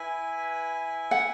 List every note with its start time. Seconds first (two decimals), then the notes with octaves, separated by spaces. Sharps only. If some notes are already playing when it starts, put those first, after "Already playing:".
Already playing: E4 B4 G#5
1.11 F#5